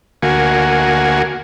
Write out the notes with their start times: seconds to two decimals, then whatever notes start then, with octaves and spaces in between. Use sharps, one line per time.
0.23 D2 A#3 F#4 G#5